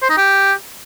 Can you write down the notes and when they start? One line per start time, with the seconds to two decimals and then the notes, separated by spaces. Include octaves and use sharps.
0.02 C5
0.10 D#4
0.18 G4